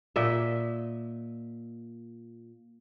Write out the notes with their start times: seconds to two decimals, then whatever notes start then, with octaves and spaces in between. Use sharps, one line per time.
0.16 A#2 D#5 E5